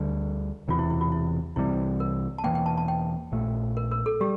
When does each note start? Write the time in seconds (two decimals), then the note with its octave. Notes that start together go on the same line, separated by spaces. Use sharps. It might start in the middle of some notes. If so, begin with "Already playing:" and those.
Already playing: D2 D3 G3
0.68 E1 E2 C3 E3 F4
0.79 E4
0.90 E4
1.01 F4
1.12 E4
1.56 C2 C3 E3 G3 E4
2.00 A#4
2.38 A5
2.44 E1 E2 E3 A#3 G5
2.55 G5
2.66 A5
2.77 A5
2.88 G5
3.32 A#1 A#2 A3
3.77 A#4
3.91 A#4
4.06 A4
4.20 G3 G4